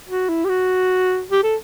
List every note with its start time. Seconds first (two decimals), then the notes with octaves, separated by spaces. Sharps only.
0.09 F#4
0.29 E4
0.45 G4
0.49 F#4
1.31 G4
1.43 A4